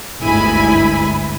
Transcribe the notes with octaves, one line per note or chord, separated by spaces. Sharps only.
G1 D2 G#2 E4 G#5 B5